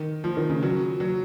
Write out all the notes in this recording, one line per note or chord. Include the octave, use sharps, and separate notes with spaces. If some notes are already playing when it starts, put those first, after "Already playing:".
Already playing: D#3
F3
D#3
C#3
F#3
F#3